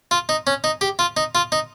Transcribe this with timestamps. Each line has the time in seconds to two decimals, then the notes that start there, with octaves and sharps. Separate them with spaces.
0.11 F4
0.29 D#4
0.47 C#4
0.64 D#4
0.81 G4
0.99 F4
1.17 D#4
1.35 F4
1.52 D#4